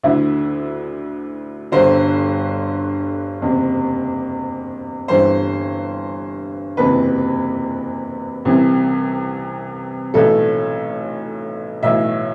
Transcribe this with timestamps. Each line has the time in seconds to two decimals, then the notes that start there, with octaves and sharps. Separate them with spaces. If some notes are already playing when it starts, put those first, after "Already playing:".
0.03 D2 D3 E4
1.72 G1 G2 D3 C5
3.41 F#1 E2 C3
5.08 G1 G2 E3 C5
6.77 F#1 E2 C3 E3 B4
8.45 C2 C3 E3
10.14 B1 A2 E3 A4
11.83 B1 A2 E3 E5